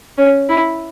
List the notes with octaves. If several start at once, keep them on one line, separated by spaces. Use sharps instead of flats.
C#4
E4